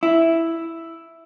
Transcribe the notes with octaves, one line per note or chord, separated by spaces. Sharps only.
E4